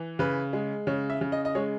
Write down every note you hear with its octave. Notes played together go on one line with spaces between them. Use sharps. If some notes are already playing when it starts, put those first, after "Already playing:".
Already playing: E3
C#3 B4
G#3
C#3 C#5
E5
C#3
D#5
D#5
G#3 C#5